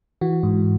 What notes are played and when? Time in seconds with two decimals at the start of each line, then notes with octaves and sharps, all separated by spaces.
0.21 E3 F#4
0.43 G#2